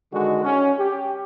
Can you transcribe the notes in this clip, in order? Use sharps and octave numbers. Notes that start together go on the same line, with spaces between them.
D3 D#3 G#3 F#4
C#4
G4